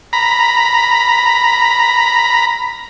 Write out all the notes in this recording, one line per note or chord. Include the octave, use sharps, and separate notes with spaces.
A#5 B5